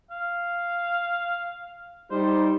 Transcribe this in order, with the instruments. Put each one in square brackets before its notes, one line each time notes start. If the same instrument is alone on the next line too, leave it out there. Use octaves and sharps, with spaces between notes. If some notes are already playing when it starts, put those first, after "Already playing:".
[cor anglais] F5
[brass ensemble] G3 D#4 [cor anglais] C5